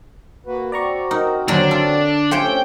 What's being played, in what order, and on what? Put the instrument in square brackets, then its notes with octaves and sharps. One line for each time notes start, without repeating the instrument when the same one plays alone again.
[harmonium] A#3 F#4 B4
[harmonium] C4 F#4 [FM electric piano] D5 A#5 C#6
[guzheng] D#4 [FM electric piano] A#4
[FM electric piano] D#2 C#4 C5 [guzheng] D3 F#3 A#4 [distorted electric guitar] D4
[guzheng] F4 [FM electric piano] A4
[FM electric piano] A3 F4 [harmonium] C4 C#4 [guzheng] G4 C5 C#5 [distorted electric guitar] G5